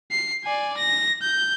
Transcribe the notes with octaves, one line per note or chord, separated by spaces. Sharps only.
C7
D5 G#5
A#6
G6